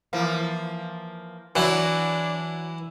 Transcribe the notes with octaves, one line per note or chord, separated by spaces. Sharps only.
E3 F3 A#3
E3 F#3 D4 E4 F#4